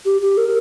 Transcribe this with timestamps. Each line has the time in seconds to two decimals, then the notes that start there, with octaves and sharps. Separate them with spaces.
0.05 G4
0.21 G4
0.37 A#4